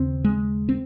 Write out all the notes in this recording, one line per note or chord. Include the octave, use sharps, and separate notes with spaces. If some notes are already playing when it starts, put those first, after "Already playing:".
Already playing: D#2 C#3 C4
G#3
C4